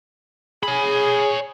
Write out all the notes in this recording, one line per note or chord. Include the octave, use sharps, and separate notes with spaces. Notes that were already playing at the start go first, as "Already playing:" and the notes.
G#4 C#5 B5